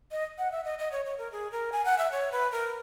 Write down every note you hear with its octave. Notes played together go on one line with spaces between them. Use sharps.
D#5
F#5
E5
D#5
D#5
C#5
C#5
A#4
G#4
A#4
G#5
F#5
E5
C#5
B4
A#4